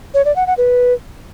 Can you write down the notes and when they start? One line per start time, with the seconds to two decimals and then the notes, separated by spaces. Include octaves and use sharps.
0.14 C#5
0.25 D5
0.36 F#5
0.47 F#5
0.58 B4